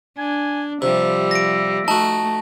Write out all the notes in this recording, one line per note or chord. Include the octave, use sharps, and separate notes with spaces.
D4 G#5
C3 F3 G3 E5
A#6 D7
A3 D#4 F#4 A5